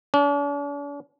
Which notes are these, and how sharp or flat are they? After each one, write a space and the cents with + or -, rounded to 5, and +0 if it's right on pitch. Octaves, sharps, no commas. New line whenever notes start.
D4 -45